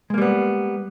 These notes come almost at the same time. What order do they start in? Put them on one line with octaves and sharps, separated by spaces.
G#3 A#3 G3 B3